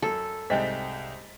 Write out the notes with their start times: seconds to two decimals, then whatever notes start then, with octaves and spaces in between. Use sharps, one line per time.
0.02 F#2 A4
0.50 C2 G#2 G3 C5 D#5 E5 G5 B6